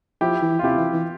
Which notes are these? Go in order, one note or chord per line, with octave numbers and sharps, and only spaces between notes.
F3 E4 G4
E3
F4
C3 E4 G4
E3
E3